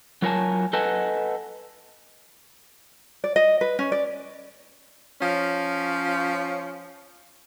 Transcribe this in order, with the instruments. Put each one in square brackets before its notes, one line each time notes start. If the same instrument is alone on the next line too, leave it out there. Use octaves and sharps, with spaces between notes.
[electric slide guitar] F#3 F4 A#4 C#5 G#5 A5
A4 B4 D#5 F#5 G#5 A5
[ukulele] D5
D#5
B4
C#4
D5
[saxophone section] F3 C#4